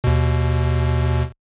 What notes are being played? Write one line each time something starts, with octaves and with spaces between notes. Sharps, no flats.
D#2 B2